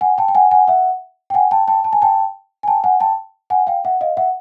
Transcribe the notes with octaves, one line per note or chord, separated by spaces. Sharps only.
F#5 G#5
G5 A5
G5
F#5 G#5
F#5 G#5
E5 F#5
G5
F#5 G#5
G5 A5
G5 A5
A5
G#5
G5 A5
G#5
G5 A5
F#5 G#5
G5 A5
F#5 G#5
F5 G5
E5 F#5
D#5 F5
E5 F#5